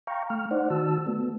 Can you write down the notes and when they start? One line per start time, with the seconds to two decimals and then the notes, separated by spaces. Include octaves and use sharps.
0.07 F5 G5 A#5 C#6
0.30 A3 F6
0.51 D#4 C5 D5 F#5
0.70 D#3 F#4 A5 E6
1.07 A3 B3